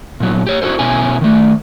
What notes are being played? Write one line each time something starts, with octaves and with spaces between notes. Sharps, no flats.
A#2 F#3 B3
G4 C#5
E4 F#4 G#4 A4 C5
B2 B3 C#4 E4 G#5
D#3 A3